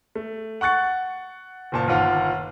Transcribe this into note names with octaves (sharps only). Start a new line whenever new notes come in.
A3
F#5 C#6 F#6 A6 C#7
F#1 A#2 A5
G1 D#2 F4 F#5 F6